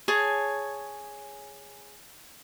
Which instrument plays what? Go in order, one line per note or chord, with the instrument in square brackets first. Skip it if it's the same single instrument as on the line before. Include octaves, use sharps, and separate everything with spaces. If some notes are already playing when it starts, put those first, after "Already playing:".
[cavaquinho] G#4 C#5 G#5 A5